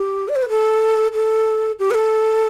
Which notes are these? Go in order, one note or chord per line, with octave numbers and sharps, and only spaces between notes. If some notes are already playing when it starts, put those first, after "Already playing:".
Already playing: G4
D5
C5
B4
A4
A4
G4
B4
A4